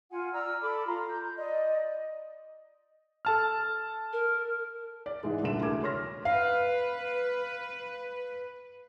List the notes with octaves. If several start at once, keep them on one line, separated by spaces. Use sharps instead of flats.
F4 F#5 G#5
D5 A#5 E6 F6
A4 B5 D6
F4 A#5 C6
G6
D5 D#5
A4 A5 F6
A#4
D5
G#2 E3 G#3
C2 A#2 D3 E3 A4 E7
D2 A3 G#4 A#4 D6 G#6
C#5 C6 F6 A#6
B4 F5